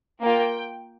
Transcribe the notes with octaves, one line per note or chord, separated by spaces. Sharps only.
A#3 F4 G5